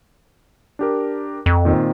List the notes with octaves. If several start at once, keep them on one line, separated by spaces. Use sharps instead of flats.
D4 G4 A#4
F2
A#2 D#3 C4